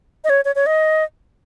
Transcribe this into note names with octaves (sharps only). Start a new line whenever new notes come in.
D#5
C#5
C#5
C#5
D#5